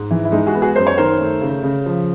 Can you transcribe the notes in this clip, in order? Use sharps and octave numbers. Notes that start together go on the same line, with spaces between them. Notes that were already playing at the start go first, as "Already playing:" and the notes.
Already playing: G#2
E3
E4
G#3 D#4
F#4 G#4
B3
F#4 G#4
F#2 C5
C#5
D#3 A#4 C5
A3
C#3
C#3
F3